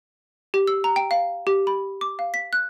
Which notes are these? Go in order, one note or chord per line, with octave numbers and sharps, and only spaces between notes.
G4
E6
A#5
G5
F5
G4
B5
D6
F5
B6
F#6